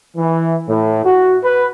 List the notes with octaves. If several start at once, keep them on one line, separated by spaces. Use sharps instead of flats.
E3
A2
F#4
B4